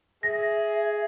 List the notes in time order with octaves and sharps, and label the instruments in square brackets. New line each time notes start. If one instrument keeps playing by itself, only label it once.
[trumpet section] G#4 [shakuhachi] E5 [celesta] A#6